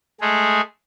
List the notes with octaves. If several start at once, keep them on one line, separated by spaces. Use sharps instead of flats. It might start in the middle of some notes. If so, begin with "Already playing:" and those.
G#3 A3 G#4